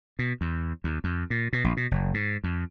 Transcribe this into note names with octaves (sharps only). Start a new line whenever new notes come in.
B2
E2
D#2
F2
A#2
B2
A#1
B2
F#1
G#2
F2